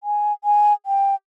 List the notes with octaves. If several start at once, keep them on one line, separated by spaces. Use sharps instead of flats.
G#5
G#5
G5